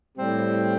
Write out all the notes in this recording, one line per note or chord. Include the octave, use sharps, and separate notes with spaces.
A2 G3 C4